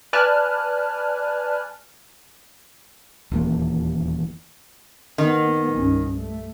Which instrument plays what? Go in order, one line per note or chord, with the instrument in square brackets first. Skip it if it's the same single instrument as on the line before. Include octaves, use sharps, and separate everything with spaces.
[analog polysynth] B4 D5 G#5 A5 F6 F#6
[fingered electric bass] D#1 E2 A#3
[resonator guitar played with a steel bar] D#3 [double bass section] A#3 B3
[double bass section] C2 G2 C#4
A3